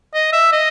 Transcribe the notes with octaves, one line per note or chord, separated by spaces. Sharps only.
D#5
E5
D#5